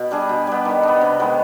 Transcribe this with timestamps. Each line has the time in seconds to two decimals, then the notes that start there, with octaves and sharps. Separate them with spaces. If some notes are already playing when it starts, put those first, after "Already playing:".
Already playing: B2
0.11 G3 D4 G#4
0.29 B2
0.47 G3 B3
0.65 D#3
0.83 B3 D4
1.01 C3
1.19 D#3 G#3 B3